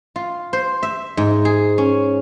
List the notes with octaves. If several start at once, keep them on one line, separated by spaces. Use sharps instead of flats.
F4
C5
E5
G#2
G#4
C#4